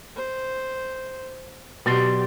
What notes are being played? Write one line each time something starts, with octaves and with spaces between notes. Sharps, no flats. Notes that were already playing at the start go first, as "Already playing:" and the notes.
C5
B2 F#3 G4 D5 C6